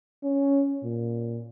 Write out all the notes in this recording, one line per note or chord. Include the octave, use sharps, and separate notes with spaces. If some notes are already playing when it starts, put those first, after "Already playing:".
C#4
A#2